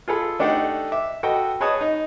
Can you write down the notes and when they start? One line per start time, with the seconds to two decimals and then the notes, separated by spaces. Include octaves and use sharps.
0.08 F4 G#4 A4 B5
0.39 A3 D4 D#4 G4 A4 F#5
0.92 E5 D6
1.23 F#4 A4 B4 D#5 F#5 G5
1.60 G#4 B4 C#5 D#5 A5 D#6
1.81 D#4